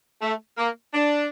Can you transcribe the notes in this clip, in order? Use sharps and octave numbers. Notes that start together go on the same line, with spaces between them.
A3
A#3
D4